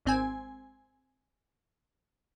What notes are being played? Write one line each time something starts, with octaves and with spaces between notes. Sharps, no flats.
G#1 C4 G#5